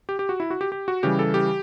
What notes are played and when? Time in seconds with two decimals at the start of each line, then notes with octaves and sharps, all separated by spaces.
0.09 G4
0.19 G4
0.29 F#4
0.40 E4
0.50 F#4
0.61 G4
0.72 G4
0.88 F#4
1.03 C#3 E3 G3 G4
1.19 A4
1.34 G4